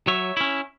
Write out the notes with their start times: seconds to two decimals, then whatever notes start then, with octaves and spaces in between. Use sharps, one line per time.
0.07 F#3 C#5 E5
0.37 C#4 E4